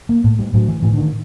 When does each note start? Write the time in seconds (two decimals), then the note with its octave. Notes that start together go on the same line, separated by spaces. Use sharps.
0.09 A#3
0.24 A2
0.39 G3
0.54 A2 F#3
0.68 E3
0.83 A2 E3
0.93 D3
0.97 D#3